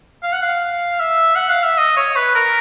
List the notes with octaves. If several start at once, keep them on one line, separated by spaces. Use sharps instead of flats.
F5
F#5
F5
E5
F#5
F5
E5
D#5
C#5
B4
A#4